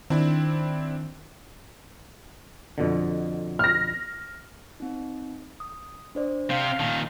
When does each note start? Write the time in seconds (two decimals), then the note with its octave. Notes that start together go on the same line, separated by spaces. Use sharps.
0.10 D#3 C4 D4 E4
2.78 F2 B2 D3
3.59 F6 A#6
4.80 C4 D#4
5.60 D#6
6.15 D4 C5 D5
6.50 C3 F5 G6
6.80 A#2 D#3 A5